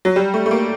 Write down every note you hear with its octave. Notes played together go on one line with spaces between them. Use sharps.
F#3
G3
A3
A3
A#3